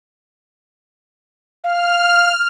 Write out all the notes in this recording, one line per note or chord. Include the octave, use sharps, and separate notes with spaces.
F5 F6